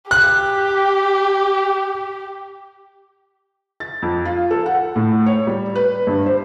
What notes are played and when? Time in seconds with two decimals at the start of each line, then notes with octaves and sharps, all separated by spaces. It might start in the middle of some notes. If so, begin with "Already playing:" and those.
0.11 G4 F#6
3.80 A6
4.02 F2
4.25 F4
4.51 A4
4.66 F#5
4.96 A2
5.26 C#5
5.47 G3
5.75 B4
6.07 G2
6.26 C5